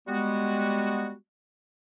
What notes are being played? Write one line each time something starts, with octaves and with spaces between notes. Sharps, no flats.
G3 G#3 B3 F#4